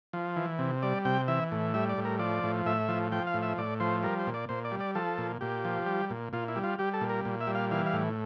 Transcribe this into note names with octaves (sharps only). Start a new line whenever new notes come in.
F3
E3
C3
G3 D5
C3 G5
E3 E5
A2
G3 E5
D5
A2
A#4
F3 D5
A2
A2 E5
F3
F3 G5
F5
A2
E5
A2 D5
F3 C5
G3 A#4
C5
A#2
D5
A#2 C5
D5
G3
D5
F3 A4
A#2
A#2 G4
F3
G3
A#2
A#2 F4
E4
G3
F4
G3 G4
A4
A#2
A#4
A#2
E5
G3
F5
E3 F5
F5
A2